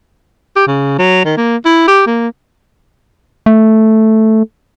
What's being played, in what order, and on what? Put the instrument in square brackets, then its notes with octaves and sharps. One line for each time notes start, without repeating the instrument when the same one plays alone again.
[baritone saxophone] G4
C#3
F#3
D#3
A#3
E4
G4
A#3
[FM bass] A3